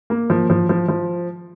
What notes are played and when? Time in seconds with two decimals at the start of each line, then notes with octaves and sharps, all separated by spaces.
0.10 A#3
0.30 F3
0.50 F3
0.69 F3
0.88 F3